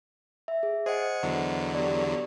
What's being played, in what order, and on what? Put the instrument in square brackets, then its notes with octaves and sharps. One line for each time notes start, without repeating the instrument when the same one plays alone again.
[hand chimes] E5
G#4
[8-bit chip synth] G#4 C#7 [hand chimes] C5 D#5 F#5
[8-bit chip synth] E2 D3 F#3
[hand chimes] G4 D5